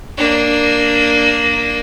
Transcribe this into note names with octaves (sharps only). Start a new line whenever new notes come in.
A#3 D4